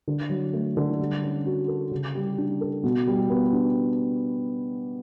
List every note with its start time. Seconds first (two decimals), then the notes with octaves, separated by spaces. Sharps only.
0.08 D3
0.30 F#3
0.53 A3
0.77 D3
1.00 G3
1.23 C#4
1.46 F#4
1.68 A4
1.91 C#3
2.15 G3
2.38 D4
2.61 A4
2.84 B2
3.07 G3
3.30 B3
3.53 D4